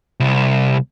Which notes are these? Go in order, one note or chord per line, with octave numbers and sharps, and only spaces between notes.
C2